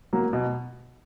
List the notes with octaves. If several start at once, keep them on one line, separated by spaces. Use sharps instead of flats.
F#3 A#3
B2